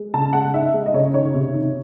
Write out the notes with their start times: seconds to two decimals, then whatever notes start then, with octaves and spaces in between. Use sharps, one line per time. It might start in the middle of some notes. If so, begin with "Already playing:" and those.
Already playing: G#3
0.14 C#3 A5
0.33 G#3 F#5
0.54 D#4 E5
0.74 G#3
0.86 D#5
0.94 C#3 C#5
1.14 D#3 C#5
1.34 C3
1.54 D#3